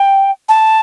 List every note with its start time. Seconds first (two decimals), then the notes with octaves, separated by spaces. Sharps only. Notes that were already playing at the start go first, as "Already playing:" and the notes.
Already playing: G5
0.48 A5